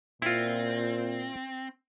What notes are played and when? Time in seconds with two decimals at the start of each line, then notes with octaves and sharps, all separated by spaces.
0.22 A#2 C4 E4 F4